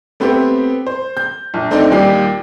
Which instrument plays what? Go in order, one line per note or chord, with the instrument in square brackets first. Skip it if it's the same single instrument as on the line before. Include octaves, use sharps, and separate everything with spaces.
[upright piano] A3 B3 C4 G4
C5
G6
A#1
A3 C4 D4 D#4
D#2 A#2 G3 G4 C7